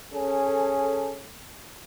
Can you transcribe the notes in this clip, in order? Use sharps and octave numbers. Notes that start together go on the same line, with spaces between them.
C#4 G#4 A4